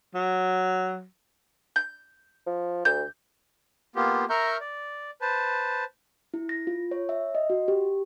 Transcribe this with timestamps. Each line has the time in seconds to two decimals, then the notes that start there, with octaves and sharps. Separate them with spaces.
0.15 F#3
1.76 G6
2.47 F3
2.85 D2 G6
3.96 A#3 B3 F4 G4
4.30 A#4 E5 A#5 C#6 F6 G6
4.60 D5
5.21 B4 C5 A5
6.34 E4
6.49 A#6
6.67 F4
6.91 C#5
7.09 E5
7.35 D#5
7.50 F#4
7.68 G4